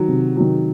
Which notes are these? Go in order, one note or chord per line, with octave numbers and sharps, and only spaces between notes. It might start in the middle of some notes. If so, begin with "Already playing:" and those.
Already playing: D#3 F#3
C3
D#3 F#3